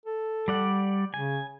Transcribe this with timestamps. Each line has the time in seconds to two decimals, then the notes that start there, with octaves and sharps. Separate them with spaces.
0.05 A4
0.48 G3 D5 F#5
1.14 C#3 G#5